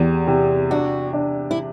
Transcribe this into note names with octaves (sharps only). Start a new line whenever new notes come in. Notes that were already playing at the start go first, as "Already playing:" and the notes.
Already playing: E2 G4
C3
D4 F#4
D4
E4